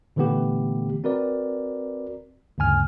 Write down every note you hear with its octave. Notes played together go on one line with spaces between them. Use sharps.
A#2 D3 E3 A3 B3 G4
C4 F#4 A#4 B4 D5
D2 G2 C#3 G#5 F6